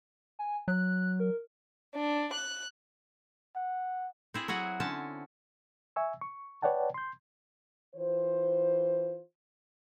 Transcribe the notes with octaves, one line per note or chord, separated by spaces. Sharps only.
G#5
F#3 F#6
A#4
D4
F#6
F#5
C4 E4 G#4
F#3 E4 F#4 G#4 F#5
D3 C4 C#4 A5
E5 G#5 C#6 E6
C#6
B4 C#5 D5 F#5 G5 A5
C6 G6
E3 F4 C5